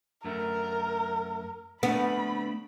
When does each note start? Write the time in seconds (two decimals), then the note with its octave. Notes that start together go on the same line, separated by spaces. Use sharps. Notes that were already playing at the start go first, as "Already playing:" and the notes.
0.24 F#2 A3 A#4
1.83 A3 B3 C4 D4 B5